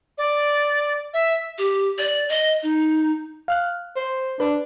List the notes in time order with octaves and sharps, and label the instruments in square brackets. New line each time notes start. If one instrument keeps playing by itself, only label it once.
[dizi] D5
E5
[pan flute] G4
D5
D#5
D#4
[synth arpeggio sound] F5 F6 F#6
[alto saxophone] C5
[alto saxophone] D4 [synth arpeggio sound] B4